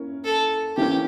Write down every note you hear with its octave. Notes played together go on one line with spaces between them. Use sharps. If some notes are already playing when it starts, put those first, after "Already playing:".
Already playing: A#3 C#4 E4 A#4
A4
E3 A#3 C#4 E4 G4